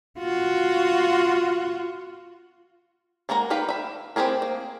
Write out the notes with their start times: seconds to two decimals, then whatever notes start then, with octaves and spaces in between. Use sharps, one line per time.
0.19 F4 F#4
3.29 G#3 A#3 F#4 A#4 A#5
3.50 D#4 B4 F5 G5 B5
3.69 E5 B5
4.16 C4 E4 G4 G#4 A#4
4.42 A#3